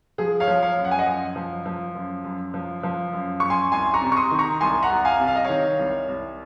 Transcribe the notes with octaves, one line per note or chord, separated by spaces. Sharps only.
F3 G#4
C#5 F5
F3
C#5 F5
F#2
F#5
G#5
D#5 F#5
F#2
F3
F3
F#2
F#2
F3
F3
F#2
F#2 C#6
G#5 C6
C2 G#5 C6
A#5 C#6
C3
C#6
C6 D#6
D#3
A#5 C#6
C2 G#5 C6
F#5 A#5
C2
F5 G#5
C3
F5
D#5
D#3 C#5 F5
C2
C2